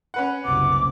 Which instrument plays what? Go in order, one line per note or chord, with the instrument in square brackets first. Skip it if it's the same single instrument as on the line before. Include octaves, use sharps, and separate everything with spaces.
[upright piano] C#4 B4 F#5
[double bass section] F#1 C2 B2 [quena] D6